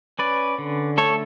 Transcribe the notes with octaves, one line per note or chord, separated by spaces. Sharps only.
C#4 B4 D5
D3
A3 A4 C#5